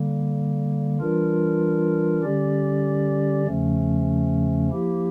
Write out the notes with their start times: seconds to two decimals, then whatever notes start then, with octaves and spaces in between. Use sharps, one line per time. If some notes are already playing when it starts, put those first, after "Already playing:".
Already playing: D3 G3 A#3
1.00 E3 G3 D4 F4 A#4
2.23 D3 G3 C#4 G4 D5
3.46 E2 C#3 F3 A3 C#4
4.70 F3 A#3 E4 G4